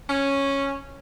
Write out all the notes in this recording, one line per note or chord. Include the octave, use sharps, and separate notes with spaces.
C#4